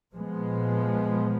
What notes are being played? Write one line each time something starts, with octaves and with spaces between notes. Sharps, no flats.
A#2 F3 G#3 B3